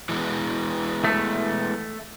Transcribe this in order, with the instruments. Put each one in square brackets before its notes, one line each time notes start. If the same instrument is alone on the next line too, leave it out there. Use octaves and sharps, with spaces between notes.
[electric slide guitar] E3 G#3 B3
[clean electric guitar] A3